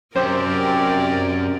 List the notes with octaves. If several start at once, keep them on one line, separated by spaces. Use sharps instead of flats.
F#2 C3 C4 G4 A#4 C5 D5